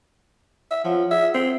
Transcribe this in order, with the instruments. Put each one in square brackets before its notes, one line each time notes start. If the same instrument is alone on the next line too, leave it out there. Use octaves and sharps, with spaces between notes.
[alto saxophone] E5
[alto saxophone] F3 [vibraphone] F4 C#5 F#5
[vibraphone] G#4 [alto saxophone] E5
[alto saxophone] C4